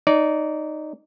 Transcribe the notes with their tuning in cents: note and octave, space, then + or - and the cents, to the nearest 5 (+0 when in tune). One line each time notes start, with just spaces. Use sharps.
D#4 -15 D5 -30